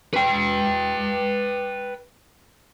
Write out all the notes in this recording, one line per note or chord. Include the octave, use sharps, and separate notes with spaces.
B4 G5